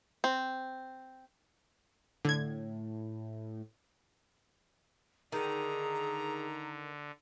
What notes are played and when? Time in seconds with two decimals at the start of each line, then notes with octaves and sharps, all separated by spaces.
0.24 C4
2.25 A2 D3 G#6
5.32 D3 D#3 G#4 A#5